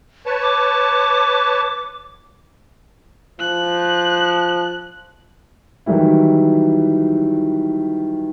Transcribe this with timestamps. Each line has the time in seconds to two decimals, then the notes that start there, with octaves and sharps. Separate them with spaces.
0.26 B4 C#5 A5
0.42 D6
3.40 F3 F#6
5.86 D#3 E3 F#3 G3 E4